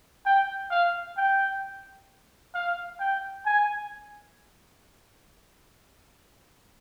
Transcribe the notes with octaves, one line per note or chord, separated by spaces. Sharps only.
G5
F5
G5
F5
G5
G#5